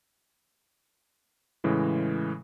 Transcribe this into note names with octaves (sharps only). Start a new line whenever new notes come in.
A2 C#3 E3 G#3